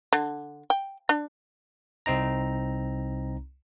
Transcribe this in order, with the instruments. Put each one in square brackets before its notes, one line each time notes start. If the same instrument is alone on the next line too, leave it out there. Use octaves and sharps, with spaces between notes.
[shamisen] D3
G5
D4
[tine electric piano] C2 C4 D#4 A#5